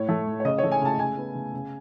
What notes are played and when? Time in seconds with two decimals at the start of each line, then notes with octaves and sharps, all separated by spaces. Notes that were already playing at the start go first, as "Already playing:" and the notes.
Already playing: A2 C#5
0.09 A3
0.27 A2
0.40 C#5
0.45 C#3 D#5
0.58 A3 C#5
0.72 G#5
0.81 C#3 A5
0.99 C#3 G#5
1.17 B3
1.35 C#3
1.54 C#3